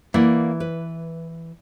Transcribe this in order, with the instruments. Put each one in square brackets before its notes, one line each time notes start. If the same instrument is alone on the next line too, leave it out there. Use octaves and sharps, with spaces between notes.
[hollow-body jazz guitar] E3 [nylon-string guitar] A#3 D5 F#5
[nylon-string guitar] B4